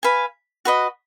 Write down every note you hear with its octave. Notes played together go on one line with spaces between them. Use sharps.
B4 F5 G#5
F#4 B4 D#5